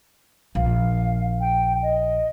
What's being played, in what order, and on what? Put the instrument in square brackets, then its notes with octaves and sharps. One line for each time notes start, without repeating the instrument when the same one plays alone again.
[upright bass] A#1 [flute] F5
[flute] G5
D#5